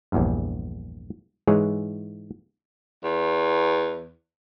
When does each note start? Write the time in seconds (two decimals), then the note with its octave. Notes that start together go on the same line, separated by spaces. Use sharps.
0.12 A#1 E2 G2
1.47 G#2 E3 G#3 G#4 C#5
3.04 E2